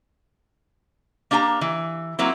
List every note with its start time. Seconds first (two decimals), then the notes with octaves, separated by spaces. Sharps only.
1.31 A#3 D4 G4 G#5 A#5
1.61 E3
2.19 F#3 A#3 C4 E4